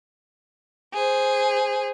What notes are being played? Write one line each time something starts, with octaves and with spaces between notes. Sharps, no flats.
G#4 C5